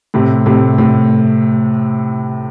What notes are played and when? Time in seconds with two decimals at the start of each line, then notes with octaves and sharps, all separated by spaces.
0.14 A2 C3
0.46 A2 C3
0.78 A2